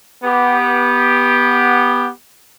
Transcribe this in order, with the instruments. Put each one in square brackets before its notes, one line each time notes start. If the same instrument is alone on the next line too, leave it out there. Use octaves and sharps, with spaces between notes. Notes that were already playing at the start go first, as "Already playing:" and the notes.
[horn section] B3 G4